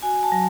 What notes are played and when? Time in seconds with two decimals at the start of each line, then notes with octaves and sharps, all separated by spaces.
0.03 F#4 G#5
0.23 A5
0.32 F#3